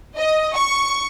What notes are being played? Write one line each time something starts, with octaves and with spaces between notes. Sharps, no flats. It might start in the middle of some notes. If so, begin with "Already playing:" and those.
D#5
C#6